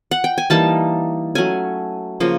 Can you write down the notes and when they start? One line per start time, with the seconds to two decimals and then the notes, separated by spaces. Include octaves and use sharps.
0.11 F#5
0.24 G5
0.38 G#5
0.50 E3 G3 A#3 D#4 A5
1.35 F#3 A3 C#4 G#5
2.20 C#3 F3 A#3